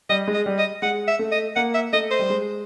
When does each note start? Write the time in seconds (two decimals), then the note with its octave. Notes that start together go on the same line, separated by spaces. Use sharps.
0.09 G3 D#5
0.28 G#3
0.34 D#5
0.46 G3
0.58 D#5
0.82 G#3 F#5
1.08 E5
1.19 A3
1.32 D#5
1.56 A#3 F#5
1.74 E5
1.93 A3 D#5
2.11 C5
2.19 G3
2.30 G#3